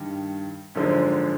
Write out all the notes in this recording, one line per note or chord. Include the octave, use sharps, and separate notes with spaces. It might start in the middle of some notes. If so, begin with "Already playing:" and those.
Already playing: G2 D#3
G#1 F#2 D3 F3 G#3